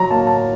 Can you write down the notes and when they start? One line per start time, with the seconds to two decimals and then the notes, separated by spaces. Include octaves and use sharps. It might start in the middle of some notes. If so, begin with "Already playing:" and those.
Already playing: F#3 A#5
0.11 A#3 A5
0.27 A5